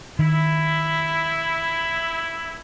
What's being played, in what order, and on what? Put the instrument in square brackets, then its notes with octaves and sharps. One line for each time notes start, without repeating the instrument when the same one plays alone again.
[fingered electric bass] D#3 [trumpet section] E4